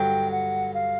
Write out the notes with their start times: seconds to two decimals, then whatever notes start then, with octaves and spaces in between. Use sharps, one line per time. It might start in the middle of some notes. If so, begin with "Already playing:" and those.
Already playing: G2 D3 F#3 G5
0.31 F#5
0.74 F5